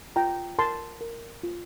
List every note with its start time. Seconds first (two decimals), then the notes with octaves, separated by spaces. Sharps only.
0.16 F4 G5 A#5
0.59 A#4 A5 C6
1.01 A#4
1.43 F4